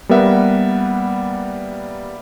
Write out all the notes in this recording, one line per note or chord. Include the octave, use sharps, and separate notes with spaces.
G3 A#3 B3 A#4 E5 F#5